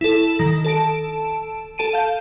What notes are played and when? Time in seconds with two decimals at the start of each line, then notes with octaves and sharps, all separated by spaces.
0.01 E4 A4
0.39 D#3 A#6
0.65 A4 A5 D7
1.78 A4 A5 D7 D#7
1.93 F5 G6